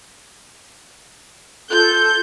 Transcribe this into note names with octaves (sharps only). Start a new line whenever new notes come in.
F4 A4 G6